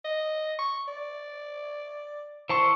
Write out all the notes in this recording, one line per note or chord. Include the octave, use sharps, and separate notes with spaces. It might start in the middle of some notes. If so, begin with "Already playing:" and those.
D#5
C#6
D5
E3 C5 A5 C#6